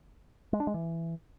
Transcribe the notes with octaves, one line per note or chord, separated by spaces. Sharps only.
G#3
D4
G#3
E3